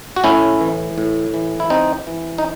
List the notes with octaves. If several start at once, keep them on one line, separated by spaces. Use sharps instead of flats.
F#4
A2 C#4 E4
E3
A2
E3
E4
C3 C4 D#4
E3
D#4